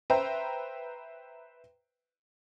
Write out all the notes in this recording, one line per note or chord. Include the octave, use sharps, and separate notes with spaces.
B4 C5 E5 G5 A#5